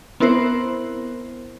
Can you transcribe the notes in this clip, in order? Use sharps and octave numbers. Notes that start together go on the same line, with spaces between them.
B3 C4 E4 A#4 C5